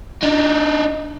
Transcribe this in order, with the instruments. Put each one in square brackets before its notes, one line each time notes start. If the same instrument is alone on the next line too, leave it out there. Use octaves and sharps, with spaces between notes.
[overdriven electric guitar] D4 D#4